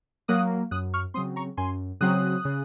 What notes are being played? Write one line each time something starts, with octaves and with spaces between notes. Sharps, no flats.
F#3 A#3 D#6 F#6
F#2 D#6 F#6
C#6 F6
C#3 F#3 C4 C6 D#6
A#5 C#6
F#2 G#5 C6
C#3 F#3 C4 D#6 F#6
C#3